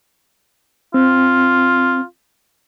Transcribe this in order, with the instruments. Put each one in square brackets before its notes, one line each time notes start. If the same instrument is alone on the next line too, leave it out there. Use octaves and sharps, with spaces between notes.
[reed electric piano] C4 [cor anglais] F4